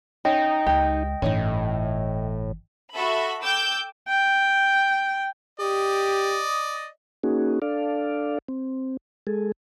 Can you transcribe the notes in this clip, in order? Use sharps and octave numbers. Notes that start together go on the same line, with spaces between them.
C#4 D#4 D#5 G5
C#2 G4
G1 A2 E3 C#4 D#4
F#4 A4 E5 B5
G5 D6 E6 G6
G5
G4 D5 D#5
A#3 C#4 D#4 F#4 G#4
D4 A4 D5 F5
C4
G#3 G#4 A4